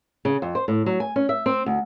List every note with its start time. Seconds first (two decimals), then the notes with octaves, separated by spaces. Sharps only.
0.25 C#3
0.42 F2
0.55 C5
0.68 A2
0.86 F#3
1.00 G#5
1.16 C#4
1.29 E5
1.46 C4
1.66 D2